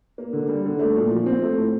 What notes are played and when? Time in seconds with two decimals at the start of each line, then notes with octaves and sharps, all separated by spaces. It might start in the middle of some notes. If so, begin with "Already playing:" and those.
0.18 A#3
0.33 D3
0.49 G3
0.65 D3
0.79 A3
0.96 A#2
1.11 F3
1.26 C4
1.42 A3
1.57 A2